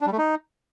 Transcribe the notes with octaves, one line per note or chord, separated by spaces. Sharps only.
D4
G3
A3
D#4